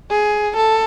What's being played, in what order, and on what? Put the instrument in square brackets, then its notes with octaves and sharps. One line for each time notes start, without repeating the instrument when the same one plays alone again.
[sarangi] G#4
A4